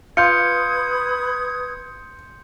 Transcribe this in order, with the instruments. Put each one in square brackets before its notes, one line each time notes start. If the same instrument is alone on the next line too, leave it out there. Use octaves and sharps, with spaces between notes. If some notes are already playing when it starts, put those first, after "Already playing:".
[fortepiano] F4 [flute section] B4 D#6 G#6 [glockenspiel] C6 G6 C#7